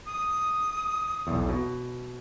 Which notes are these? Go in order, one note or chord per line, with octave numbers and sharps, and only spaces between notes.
D#6
B1 E2
B2